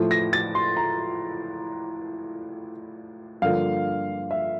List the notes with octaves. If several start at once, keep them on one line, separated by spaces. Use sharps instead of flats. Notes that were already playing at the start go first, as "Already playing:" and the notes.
Already playing: A2 F3 A3 E4
A#6
A6
C6
A#5
G2 D3 F3 A#3 F4 F5
E5